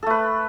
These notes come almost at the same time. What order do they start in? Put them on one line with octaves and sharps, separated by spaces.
A4 A3 B4